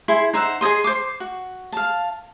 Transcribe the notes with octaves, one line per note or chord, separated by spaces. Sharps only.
E4 G#4 C6
D#4 C5 E5 F#5
G#4 C#5 D#5 C6
C5 D6
F#4
F5 A5